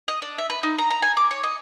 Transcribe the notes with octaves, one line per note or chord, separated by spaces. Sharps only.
D#5
D4
E5
B4
D#4
A#5
A#5
G#5
D6
C#5
D#5